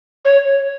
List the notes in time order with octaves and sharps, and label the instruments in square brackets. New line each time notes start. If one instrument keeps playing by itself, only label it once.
[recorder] C#5